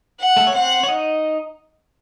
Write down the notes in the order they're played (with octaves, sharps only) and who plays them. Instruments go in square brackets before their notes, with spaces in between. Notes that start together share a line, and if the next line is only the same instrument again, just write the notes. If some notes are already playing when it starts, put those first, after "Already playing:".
[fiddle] F#5
[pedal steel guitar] A3 A4
C#5
[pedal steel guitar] C4 C5 [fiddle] F#5
[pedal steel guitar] C#5
D#4 D#5